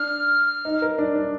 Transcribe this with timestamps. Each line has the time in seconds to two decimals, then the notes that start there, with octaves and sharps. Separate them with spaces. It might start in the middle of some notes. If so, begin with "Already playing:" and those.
Already playing: D4 F6
0.65 D#4
0.82 A#4
0.98 D4
1.15 D4